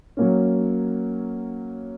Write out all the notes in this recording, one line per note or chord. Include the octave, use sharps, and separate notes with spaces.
F#3 A#3 C#4